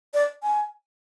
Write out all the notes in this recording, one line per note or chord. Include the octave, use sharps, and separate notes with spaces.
D5
G#5